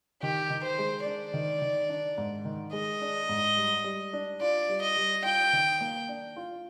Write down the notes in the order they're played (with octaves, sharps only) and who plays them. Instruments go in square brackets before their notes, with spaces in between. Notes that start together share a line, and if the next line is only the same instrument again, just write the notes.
[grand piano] D#3 [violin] G4
[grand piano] D#3
[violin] C5
[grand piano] G#3
[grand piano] D4 [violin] D5
[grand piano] D#3
D#3
D4
G#2
D#3
[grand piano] G#3 [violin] D#5
[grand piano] D4
G#2
G3
G3
D4
[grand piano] F4 [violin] D5
[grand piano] G3
[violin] D#5
[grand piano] G3
[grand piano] F4 [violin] G5
[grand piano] D#3
A#3
D4
F4